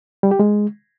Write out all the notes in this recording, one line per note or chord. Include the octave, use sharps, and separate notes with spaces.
G3
G4
G#3